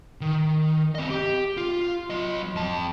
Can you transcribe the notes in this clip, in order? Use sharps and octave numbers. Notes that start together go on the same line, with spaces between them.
D#3
C4 D#5
G4
F4
F#3 D#5
F2 A5